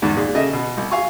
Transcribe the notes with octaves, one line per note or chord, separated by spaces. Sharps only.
E2 G#2 D#3
A#2 G#3
C#3 A4 D#5 E5
B2
C2
F5 G#5 C#6